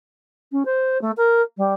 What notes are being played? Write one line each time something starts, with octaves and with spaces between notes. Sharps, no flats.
C#4
C5
A3
A#4
G3